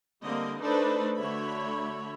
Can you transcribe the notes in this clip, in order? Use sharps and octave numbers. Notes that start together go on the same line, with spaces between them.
D3 G3 A#3 C4 D#5
A3 D4 D#4 A4 B4 C5
D3 A3 F#4 C#5 E5 B5